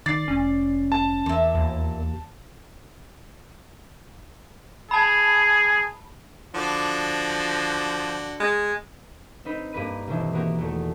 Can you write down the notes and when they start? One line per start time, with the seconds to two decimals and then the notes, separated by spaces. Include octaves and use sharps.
0.06 D#3 D5 A6 C7
0.28 F1 C#4
0.92 A5
1.26 E2 A#2 E5
1.55 D#2
4.91 G#4 A5 B5
6.55 D3 F3 F#4 D5
8.40 G#3
9.45 C4 D#4 B4
9.73 G2 A#3 B4 D#7
10.08 G1 B2 D#3 E3 C4
10.33 A#3 B3 F#4 G4
10.58 E2 A3